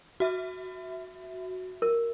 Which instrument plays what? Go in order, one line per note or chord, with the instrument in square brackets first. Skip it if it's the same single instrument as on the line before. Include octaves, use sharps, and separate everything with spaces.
[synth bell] F#4 E5
[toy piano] A#4